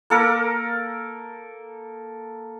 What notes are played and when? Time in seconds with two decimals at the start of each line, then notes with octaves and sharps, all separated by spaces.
0.10 A#3 A4 A#4